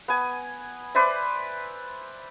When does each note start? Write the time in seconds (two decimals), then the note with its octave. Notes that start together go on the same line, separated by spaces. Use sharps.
0.08 B3 G#5
0.95 B4 C5 D5 E5